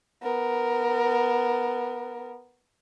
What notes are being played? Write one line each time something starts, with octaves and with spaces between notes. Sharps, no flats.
B3 A#4